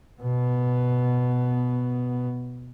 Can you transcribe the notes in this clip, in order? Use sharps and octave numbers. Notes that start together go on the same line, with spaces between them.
B2 B3